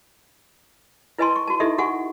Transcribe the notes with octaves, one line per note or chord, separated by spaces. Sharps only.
E4 B4 D#5 G#5 A5 C6
C#6
F#4 A5
D#4 E4 G4 A4 D#5 E5
F#4 G4 F#5 G#5 C#6